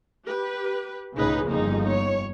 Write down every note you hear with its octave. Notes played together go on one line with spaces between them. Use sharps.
G4 B4
C#2 A2 C#3 D#4 G#4 B4
G1 F2 A#3 D#4 G#4
C#5